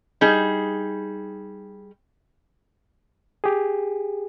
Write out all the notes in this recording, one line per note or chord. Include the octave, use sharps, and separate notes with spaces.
G3 D#4 G#4
G4 G#4